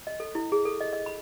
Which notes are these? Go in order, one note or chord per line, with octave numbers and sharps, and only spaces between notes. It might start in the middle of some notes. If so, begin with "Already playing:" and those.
D#5
A4
E4
G#4
A4
D#5
D#5
B5